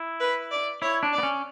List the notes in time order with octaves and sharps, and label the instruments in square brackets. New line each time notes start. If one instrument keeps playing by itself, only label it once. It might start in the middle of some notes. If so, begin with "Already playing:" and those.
Already playing: [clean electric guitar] E4
[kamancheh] B4
D5
[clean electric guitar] E4 [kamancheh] C#5
[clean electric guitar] D4
[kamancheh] D5
[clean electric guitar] B3
C#4